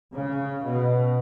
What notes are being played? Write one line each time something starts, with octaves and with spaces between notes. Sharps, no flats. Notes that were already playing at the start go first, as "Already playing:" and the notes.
C#3
B2